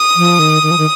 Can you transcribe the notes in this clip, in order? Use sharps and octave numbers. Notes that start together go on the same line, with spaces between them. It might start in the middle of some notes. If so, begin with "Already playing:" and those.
Already playing: D#6
F3
D#3
D#3
F3
D#3